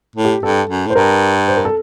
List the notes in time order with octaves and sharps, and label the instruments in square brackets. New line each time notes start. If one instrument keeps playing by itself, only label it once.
[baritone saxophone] A2
[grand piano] G4
[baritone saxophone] G2 [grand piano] A4
[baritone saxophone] F#2
[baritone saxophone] A2 [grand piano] C5
[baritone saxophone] G2 [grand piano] A#4
[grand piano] C5
A#4
A4